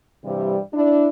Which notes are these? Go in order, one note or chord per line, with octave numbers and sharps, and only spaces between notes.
G2 C3 E3 G3
D4 E4